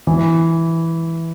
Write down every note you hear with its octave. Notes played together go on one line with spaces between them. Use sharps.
E3